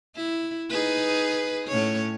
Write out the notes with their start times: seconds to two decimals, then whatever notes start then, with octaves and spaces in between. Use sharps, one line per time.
0.16 E4
0.70 D#4 G#4 B4
1.68 A2 C#4 C#5